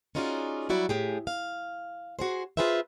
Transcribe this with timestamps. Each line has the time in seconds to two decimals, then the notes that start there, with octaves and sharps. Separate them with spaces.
0.15 C#4 D#4 F4 F#4 G#4 D5
0.69 F#3 G3 E4 F#4 D5
0.89 A2 G4 G#4
1.27 F5
2.19 F#4 G#4 C5
2.57 F4 F#4 G#4 B4 C5 E5